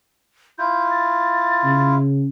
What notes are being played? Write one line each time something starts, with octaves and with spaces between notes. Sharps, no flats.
E4 F4 G6
A6
C#3